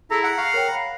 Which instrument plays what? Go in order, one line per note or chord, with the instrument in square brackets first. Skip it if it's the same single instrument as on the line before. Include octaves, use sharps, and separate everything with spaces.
[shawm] E4 [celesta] G#4 [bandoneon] A4 [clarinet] A#5
[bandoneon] F#5
[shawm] F5 [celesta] C#6
[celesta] A#4 C#5 G5
[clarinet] A#5 [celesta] B5 C7